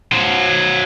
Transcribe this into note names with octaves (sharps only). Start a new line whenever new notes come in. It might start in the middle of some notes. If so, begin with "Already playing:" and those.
F#3 C5